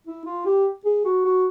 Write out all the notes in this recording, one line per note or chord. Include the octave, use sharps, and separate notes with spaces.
E4
F4
G4
G#4
F#4
F#4